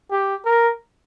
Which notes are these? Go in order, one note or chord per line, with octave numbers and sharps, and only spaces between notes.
G4
A#4